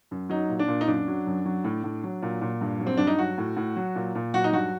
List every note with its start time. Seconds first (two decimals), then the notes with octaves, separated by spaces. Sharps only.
0.11 F#2
0.29 F#3 D#4
0.49 A#2
0.59 D4
0.68 A#2
0.81 D#4
0.87 F#2 D4
1.08 F#3
1.27 F#2
1.45 F#3
1.64 A2
1.84 A2
2.04 F#3
2.22 A#2
2.42 A#2
2.61 G2
2.80 F#3
2.87 C4
2.97 G2 D4
3.07 D#4
3.19 F#3 F#4
3.38 A2
3.57 A2
3.76 F#3
3.95 A#2
4.15 A#2
4.34 F#3 F#4
4.44 D#4
4.53 G2 F#4